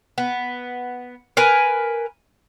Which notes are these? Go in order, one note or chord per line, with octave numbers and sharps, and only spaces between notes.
B3
A#4 B4 G#5